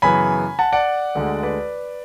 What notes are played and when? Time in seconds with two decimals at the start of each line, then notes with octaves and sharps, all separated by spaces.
0.02 F#2 C#3 E3 B3 G#5 B5
0.59 F#5 A5
0.72 D5 F#5
1.15 D2 D3 G#3
1.43 B4 D5